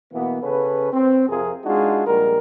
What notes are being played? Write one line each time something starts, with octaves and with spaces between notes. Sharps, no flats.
B2 E3 A#3 B3
C#3 C#4 A4 B4
C4
F2 C3 F3 F4 G#4 A#4
G#3 D4 D#4 F4 F#4 G#4
A#1 G3 G#3 A#4